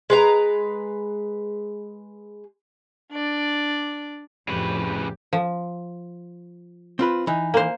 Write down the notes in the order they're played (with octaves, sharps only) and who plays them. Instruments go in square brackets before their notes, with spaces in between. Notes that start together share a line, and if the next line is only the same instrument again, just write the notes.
[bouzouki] G#3 B4 A#5
[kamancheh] D4 D5
[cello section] F2 A2 G4 [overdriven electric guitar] C#3 B4
[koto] F3
[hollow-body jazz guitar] C4 F4 B4
E3 D#4
[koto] A#3 C5